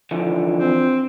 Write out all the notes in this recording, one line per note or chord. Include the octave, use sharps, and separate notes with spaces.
D3 E3 F3
C4